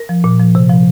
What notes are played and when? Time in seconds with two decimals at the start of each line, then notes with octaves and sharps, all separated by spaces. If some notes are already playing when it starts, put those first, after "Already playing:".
Already playing: A#4
0.09 F3
0.24 A#2
0.39 F3
0.55 C3
0.69 F3